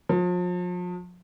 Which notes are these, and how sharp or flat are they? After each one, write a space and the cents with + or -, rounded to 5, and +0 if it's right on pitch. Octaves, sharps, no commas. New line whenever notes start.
F3 +40